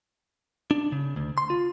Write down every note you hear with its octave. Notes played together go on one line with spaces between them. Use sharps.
D4
C#3
D2
C6
F4